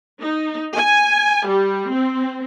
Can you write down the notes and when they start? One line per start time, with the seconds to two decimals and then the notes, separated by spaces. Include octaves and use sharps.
0.20 D#4
0.75 G#5
1.46 G3
1.93 C4